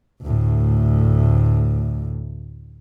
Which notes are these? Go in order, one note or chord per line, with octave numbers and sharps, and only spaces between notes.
D2 A2